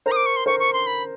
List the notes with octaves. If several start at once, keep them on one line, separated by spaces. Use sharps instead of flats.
A#4 C5 A#5
D#6
D6
C#6
C6
A#4 C5 C#6
C#6
C6
B5